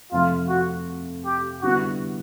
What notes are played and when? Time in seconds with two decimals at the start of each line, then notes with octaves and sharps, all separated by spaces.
0.12 F2 C3 F3 A3 F4
0.49 F#4
1.25 G4
1.62 D3 G3 B3 E4 F#4